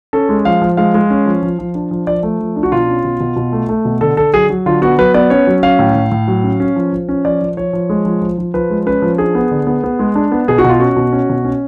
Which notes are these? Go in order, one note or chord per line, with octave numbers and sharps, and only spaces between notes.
C#4 A4
G#3
F3 F5
F3
G#3 F5
G#3
C#4
F3
F3
F3
D4
F3
F3 D5
A3
F3
D4
F#4
B2 F4
C#4
B2
B2
B2
A3
A3
B2
D3 A4
D3 A4
F#3 G#4
F#3
D3 F4
B3 F#4
F#3 B4
B3 D5
C#4 C#5
F#3
C#4 F5
A2
A2
A2
F#3
C#4
C#4
F3
F3
C#4
F3 D5
F3
F3 C#5
F3
G#3
F3
F3
F3
F3 B4
G#3
C#4 B4
F3
D4 G#4
B3
D3
B3
B3
G#3
D4
B3
B2 G#4
F#4
B2 F4
C#4 F#4
B2
C#4
B2
C#4